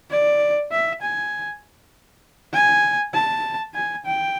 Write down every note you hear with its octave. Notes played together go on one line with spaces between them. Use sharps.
D5
E5
G#5
G#5
A5
G#5
G5